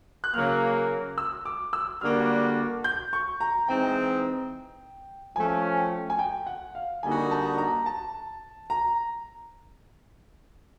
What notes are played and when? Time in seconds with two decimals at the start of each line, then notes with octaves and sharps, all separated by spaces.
0.24 F#6
0.34 C#3 F#3 A#3 F6
1.18 E6
1.45 D6
1.73 E6
2.01 D3 G3 A#3 D4 F#4 F6
2.84 G6
3.13 C#6
3.41 A#5
3.68 E3 G#3 C4 D#4 G5
5.35 F3 A3 C#4 G#5
5.77 G5
6.10 G#5
6.19 G5
6.46 F#5
6.75 F5
7.03 D3 G3 A#3 D#4 F#4 G#5
7.31 A5
7.58 A#5
7.86 A5
8.70 A#5